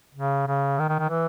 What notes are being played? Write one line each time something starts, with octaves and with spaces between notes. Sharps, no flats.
C#3
C#3
D#3
D#3
D#3
E3